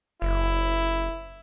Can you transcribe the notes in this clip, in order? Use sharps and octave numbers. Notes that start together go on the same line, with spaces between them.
F#1 E4